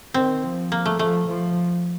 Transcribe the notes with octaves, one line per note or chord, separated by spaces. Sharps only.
D#3 C4
F3
A#3
A3
F3 A3
F3